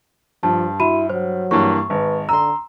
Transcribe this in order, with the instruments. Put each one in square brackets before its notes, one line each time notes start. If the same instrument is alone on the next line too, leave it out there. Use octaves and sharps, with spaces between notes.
[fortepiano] G2 [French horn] F3 [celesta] A5
[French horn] E4 [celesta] F#4 B5 D#7
[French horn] F#3 [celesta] C5
[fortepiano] G2 E3 A#3 [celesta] C#6
[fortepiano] G#1 [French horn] B4
[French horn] D3 [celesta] A#5 [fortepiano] C6 E6